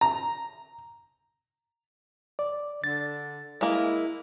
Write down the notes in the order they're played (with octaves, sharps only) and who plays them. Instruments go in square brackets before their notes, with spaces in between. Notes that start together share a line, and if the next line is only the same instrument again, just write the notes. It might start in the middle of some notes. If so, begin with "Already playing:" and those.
[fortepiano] A#5
[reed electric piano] D5
[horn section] D3 [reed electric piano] A6
[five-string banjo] G#3 A#3 [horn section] E4